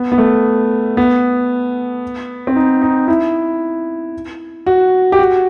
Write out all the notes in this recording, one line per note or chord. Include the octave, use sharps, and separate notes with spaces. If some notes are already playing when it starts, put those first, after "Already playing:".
Already playing: B3
B3
A3
B3
C4
D#4
D#4
E4
F#4
G4
F#4